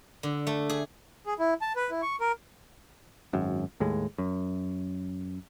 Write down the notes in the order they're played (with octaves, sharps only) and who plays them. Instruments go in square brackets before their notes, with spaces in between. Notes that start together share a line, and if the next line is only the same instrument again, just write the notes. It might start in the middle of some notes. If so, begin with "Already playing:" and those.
[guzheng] D3
A3
G#4
[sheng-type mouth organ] G#4
E4
A5
B4
E4
C#6
A#4
[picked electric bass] G#1 F#2
D#2 A2 G#3
F#2